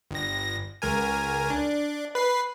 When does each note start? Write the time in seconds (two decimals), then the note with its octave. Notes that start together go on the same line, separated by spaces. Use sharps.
0.11 G1 A#6
0.82 C#2 A#4 G#5
1.50 D4
2.15 B4 C7